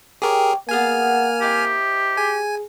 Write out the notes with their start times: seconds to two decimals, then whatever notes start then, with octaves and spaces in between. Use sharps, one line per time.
0.22 G4 G#4 A#4 C5 C#5
0.69 A#3 B3 G#4 A#4 G#5 F6
1.41 C4 D#4 E4 G4
2.17 G#4 G#5